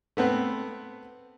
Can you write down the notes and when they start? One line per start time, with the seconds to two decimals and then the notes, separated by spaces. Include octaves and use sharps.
0.17 A3 B3 C4 B4